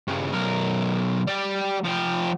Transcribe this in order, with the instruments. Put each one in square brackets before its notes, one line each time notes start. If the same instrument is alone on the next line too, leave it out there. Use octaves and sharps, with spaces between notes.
[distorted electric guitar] G2 C#3
B1 A#4
G3 G4
F3 G4